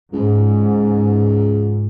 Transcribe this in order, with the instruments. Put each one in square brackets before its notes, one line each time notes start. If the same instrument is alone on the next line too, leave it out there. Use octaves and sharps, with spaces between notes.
[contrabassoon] C#2 [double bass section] G#2